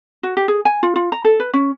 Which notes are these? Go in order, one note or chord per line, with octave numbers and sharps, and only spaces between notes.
F#4
G4
G#4
G#5
F4
F4
A#5
A4
B4
C#4